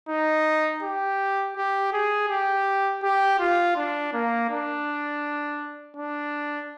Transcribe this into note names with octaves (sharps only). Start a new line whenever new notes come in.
D#4
G4
G4
G#4
G4
G4
F4
D4
A#3
D4
D4